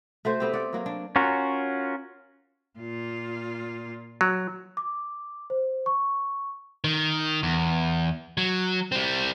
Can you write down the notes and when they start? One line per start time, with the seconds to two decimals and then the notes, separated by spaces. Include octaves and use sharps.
0.25 A3 F#4 C5
0.40 B3 C4 G4
0.53 D5 F#5
0.73 F#3 A#3 F#4
0.86 D4
1.16 C#4 F4 F#4 A#4
2.79 A#2 F4
4.21 F#3
4.77 D6
5.50 C5
5.86 C#6
6.84 D#3
7.43 E2
8.38 F#3
8.92 G3 C4